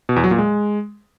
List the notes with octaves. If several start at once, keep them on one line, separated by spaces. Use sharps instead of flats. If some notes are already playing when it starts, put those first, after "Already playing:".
B2
E2
F#3
A#2
G#3